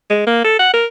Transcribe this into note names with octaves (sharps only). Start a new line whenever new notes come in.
G#3
A#3
A4
F#5
A#4